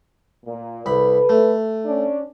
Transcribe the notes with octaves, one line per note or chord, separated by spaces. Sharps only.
A#2
C2 A4 B4 B5
A3
C#4 D4